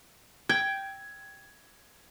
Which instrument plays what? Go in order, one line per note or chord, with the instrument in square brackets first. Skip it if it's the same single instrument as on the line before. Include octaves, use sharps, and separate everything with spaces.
[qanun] G5 [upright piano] G#6